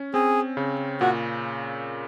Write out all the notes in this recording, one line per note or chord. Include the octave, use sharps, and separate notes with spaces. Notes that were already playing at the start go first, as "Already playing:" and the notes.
Already playing: C#4
C4 G#4
C#3
A#2 F#4